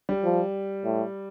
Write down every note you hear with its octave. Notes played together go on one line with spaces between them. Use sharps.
G3
F3
A2